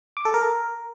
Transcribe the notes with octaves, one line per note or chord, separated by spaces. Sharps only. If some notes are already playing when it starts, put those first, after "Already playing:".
D6
A4
A#4